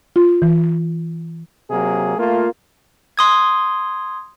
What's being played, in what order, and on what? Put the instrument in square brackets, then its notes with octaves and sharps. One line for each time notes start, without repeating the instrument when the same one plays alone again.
[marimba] F4
E3
[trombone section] C3 F#3 A#3 G#4
A3 A#3 F4
[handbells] C6 D#6 G#6